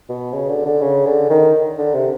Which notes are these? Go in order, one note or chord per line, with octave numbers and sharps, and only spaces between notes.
B2
C#3
D3
D3
C#3
D3
D#3
D3
C3